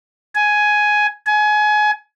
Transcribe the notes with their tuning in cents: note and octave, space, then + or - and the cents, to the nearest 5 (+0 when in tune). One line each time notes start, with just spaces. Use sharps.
G#5 +10
G#5 +25